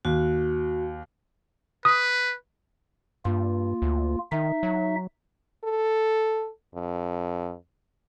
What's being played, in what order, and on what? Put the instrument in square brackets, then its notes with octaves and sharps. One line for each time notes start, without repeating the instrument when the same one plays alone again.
[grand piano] D#2 [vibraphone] F#4
[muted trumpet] B4 [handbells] D#6
[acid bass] G2 [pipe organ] A#3 F4
[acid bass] D2
[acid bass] D#3 [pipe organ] D#4 E5
[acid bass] F#3
[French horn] A4
F2